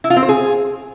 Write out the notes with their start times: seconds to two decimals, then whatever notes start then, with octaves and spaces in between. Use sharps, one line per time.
0.04 E4
0.10 F4
0.16 C4
0.23 C5
0.29 G#4